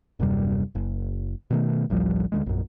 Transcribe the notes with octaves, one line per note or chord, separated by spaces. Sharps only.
D#1 F#2 C3 G3
F#1
B2 D#3 A3
A1 D2 F3 G3
D2 E3 G#3
A#1 F#2